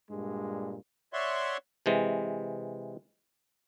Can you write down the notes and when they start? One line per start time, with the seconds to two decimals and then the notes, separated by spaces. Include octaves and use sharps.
0.10 G2 A#2 G#3
1.13 C#5 D5 E5 F#5 C6 C#6
1.86 C3 E3 G#3